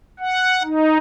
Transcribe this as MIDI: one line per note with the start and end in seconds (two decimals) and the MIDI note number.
0.19 0.63 78
0.63 0.98 63